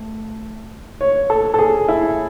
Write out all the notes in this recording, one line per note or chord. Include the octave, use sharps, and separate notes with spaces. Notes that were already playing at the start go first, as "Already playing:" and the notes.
Already playing: A3
C#5
A4
A4
G#4
E4